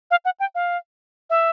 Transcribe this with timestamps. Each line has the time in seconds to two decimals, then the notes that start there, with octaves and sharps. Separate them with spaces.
0.11 F5
0.25 F#5
0.40 G5
0.55 F5
1.30 E5